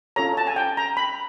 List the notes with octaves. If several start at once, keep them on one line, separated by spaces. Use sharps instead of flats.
C#4 F4 A4 C#5 A#5
A5
G#5
G5
A#5
B5